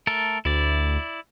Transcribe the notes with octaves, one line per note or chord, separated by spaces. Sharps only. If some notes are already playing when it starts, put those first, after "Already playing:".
A3 A4 A#4
D2 E4 D5